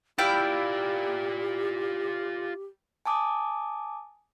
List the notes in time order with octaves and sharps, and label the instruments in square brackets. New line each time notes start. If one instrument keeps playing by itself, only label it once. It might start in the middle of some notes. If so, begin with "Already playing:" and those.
[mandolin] E4 F5 G5 [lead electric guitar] F4 D5 [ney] G4
[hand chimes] G#5 A5 D6 D#6